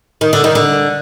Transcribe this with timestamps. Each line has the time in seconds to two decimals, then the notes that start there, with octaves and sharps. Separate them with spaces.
0.21 D#3
0.33 D3
0.44 D#3
0.55 D3